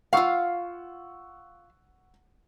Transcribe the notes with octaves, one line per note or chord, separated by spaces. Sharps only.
F4 F5 F#5 C#6 E6